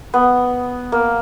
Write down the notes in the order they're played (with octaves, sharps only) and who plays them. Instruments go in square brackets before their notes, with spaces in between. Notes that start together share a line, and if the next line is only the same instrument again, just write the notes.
[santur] B3
A#3